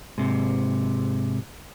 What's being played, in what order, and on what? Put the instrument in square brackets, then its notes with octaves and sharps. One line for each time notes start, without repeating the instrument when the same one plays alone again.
[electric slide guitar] G#2 C3